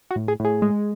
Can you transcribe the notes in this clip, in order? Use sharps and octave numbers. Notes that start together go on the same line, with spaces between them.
F#4
A2
G#4
A2 G#4
G#3